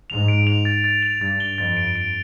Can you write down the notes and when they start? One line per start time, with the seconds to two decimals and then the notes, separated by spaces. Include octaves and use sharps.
0.09 G#2 F7
0.28 D7
0.47 F7
0.65 A6
0.84 A6
1.03 F7
1.21 G2 A6
1.40 G7
1.58 F2 A6
1.77 D7
1.96 D7